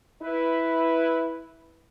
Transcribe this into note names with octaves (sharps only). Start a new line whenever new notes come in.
E4 B4